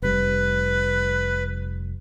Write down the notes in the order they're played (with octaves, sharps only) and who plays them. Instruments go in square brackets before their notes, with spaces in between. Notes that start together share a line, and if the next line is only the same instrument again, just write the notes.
[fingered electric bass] F1 G3 [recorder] B4